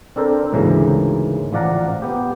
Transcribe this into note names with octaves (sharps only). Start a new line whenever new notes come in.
C4 D4 A4 A#4 C5
D2 G#2 C#3 E3 A#3 A#5
A1 F3 D5 F5 F#5 A#5
B3 G4